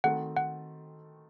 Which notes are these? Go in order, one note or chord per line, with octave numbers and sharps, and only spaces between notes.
D#3 A3 C4 F#4 A4 F#5
F#5